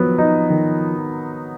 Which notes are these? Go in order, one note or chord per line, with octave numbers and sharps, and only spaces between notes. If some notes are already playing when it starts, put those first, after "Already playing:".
Already playing: D#3 F3 F#3 B3
D#4
D#3